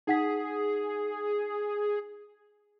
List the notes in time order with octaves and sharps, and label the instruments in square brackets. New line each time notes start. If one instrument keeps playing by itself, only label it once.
[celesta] D#4 F#5 B6 [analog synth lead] G#4